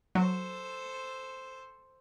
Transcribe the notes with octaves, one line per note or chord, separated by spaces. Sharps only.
F#3 A4 C5